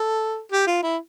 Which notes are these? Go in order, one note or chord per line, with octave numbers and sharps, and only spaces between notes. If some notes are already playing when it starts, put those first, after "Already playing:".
Already playing: A4
G4
F4
E4